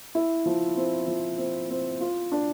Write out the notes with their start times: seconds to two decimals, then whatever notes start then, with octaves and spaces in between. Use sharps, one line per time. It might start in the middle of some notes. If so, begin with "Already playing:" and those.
0.15 E4
0.46 F3
0.77 C4
1.08 F3
1.38 C4
1.70 C4
2.01 F4
2.32 D4